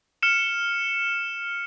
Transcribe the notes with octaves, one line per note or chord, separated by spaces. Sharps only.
F6 C#7 E7